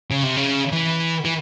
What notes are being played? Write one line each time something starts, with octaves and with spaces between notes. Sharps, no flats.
C#3
C3
C#3
E3
E3